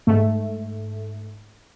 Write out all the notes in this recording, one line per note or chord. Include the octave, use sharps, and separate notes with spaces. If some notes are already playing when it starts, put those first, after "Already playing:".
G#2 A3